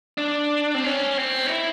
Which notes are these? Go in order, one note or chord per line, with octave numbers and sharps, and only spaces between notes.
D4
C4
C#4
C4
D#4
E4